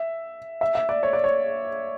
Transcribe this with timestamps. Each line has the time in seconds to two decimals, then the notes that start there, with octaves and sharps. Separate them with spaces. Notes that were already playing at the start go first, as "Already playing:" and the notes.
Already playing: E5
0.61 E5
0.75 E5
0.89 D5
1.03 C#5
1.13 D5
1.24 C#5